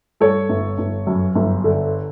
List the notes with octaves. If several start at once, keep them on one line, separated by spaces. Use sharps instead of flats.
G2 A4 C#5
G1
G1
F#2
G1
D3